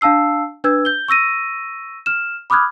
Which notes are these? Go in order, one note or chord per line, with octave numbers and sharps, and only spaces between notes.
D4 F5 A5 E6 C7
D4 B4 E6 G#6
G6 G7
C#6 E6 A#6 D#7
F6 E7
B5 D6 D#6 F6 F#6 G#6